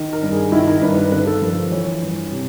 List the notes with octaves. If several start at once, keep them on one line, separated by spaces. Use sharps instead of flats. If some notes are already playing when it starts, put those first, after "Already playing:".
Already playing: D#3
A#4
G2
G#4
D#3 E4
A#4
G2 B4
B4
D3 B4
A4
F3 A#4
C5
E3 C#5
G2
C3